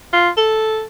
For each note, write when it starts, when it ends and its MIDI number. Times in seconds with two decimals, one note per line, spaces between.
0.13 0.29 65
0.37 0.84 69